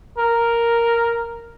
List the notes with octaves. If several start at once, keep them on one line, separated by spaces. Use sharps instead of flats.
A#4